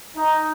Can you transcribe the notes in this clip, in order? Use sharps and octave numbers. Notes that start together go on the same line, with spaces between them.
D#4